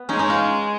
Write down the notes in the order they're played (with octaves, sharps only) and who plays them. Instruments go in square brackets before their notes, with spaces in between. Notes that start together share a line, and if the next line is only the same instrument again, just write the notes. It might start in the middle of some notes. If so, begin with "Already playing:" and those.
Already playing: [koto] B3
[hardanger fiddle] G#3 [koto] C#4 D#4
[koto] C#4 D#4
D#4 F4